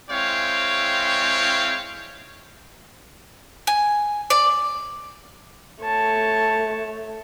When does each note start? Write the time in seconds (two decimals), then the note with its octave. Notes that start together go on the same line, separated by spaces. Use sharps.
0.11 G#3 C4 E4 C#5 F5 G5
3.67 G#5
4.30 D5
5.84 A3 C#5 A5